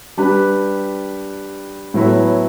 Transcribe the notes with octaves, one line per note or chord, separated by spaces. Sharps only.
G3 D4 G4 B4
A2 F#3 B3 E4 A4